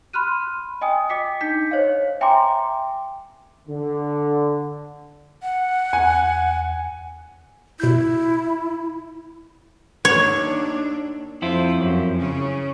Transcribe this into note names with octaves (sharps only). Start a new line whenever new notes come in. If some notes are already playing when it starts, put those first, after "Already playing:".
B5 C6 F6 F#6 D#7
D#5 G5 G#5 D#6
D#5 D6 B6 C#7
D4 D#4 G6 B6 C#7
C5 C#5 D#5 F5
E5 G5 G#5 A#5 C6 D6
D3
F#5
E2 G#5
B2 E4 G6
D#2 D4 C#5
F2 E4 F4 C5
F#2
C#3 C#4